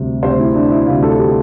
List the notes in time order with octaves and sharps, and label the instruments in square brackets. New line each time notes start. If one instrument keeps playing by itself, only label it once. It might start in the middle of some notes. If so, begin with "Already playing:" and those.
Already playing: [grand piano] D2 C3 G3
D2 C3 G3 C5
E4
D4
E4
D2 C3 G3 F4
A4
G4